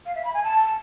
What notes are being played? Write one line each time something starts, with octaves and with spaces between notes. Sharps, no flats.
F5
E5
B5
G#5
A5